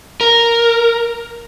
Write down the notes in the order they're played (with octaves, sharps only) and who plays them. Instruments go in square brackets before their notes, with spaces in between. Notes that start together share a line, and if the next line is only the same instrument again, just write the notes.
[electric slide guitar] A#4